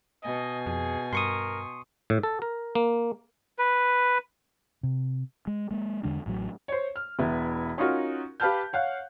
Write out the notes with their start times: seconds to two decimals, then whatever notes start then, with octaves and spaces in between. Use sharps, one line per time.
0.23 B2 D#5 G#5
0.66 F2 G#4
1.13 G2 A#4 C6 C#6 D#6
2.10 A2
2.23 A4
2.42 A#4
2.75 A#3
3.59 B4
4.83 C3
5.47 G#3
5.71 G#3 A#3
6.03 E2 D3 G#3 D4
6.26 A1 A2 C#3 F#3
6.68 C5 C#5
6.96 F6
7.19 E1 B3 E4
7.78 C#4 D#4 F4 F#4 A#4
8.40 G4 B4 F5 A5 F6 G6
8.73 C#5 F5 F#5 F#6